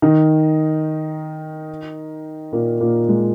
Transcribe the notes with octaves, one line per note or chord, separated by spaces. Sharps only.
D#3 D#4
A#2 A#3
A#2 A#3
G#3